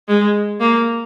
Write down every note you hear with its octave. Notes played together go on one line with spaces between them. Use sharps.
G#3
A#3